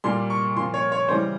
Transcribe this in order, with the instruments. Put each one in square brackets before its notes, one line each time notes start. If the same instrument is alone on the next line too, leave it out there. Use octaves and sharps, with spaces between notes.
[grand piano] A#2 G3 C6
C#6
A#2 C6
F3
C#5
C#5
C#3 E3 G3 C5